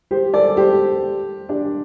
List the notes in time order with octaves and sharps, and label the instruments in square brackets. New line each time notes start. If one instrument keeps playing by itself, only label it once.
[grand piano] G4 C5
A4 D5
G4 C5
D4 G4